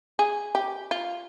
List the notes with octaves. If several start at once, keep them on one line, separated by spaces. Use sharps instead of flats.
G#4
G4
F4